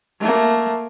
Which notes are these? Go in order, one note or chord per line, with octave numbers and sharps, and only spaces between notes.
A3 A#3